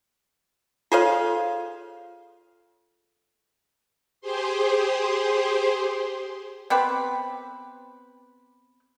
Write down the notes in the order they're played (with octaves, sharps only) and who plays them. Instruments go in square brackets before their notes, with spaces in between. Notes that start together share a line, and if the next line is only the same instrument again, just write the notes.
[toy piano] F4 A4 C#5 [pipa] G#4 C5 F5
[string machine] G4 G#4 C5 C6
[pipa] B3 C4 G4 B4